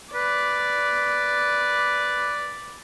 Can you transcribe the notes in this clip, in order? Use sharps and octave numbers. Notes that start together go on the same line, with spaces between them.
B4 D5